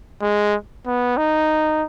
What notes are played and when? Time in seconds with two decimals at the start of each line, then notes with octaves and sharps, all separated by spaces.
0.22 G#3
0.86 B3
1.17 D#4